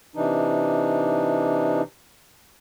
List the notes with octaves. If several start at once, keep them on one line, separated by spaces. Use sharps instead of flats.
C3 E3 D4 D#4